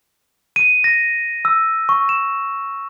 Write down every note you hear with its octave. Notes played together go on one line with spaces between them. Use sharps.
D#7
A#6
E6
C#6
E7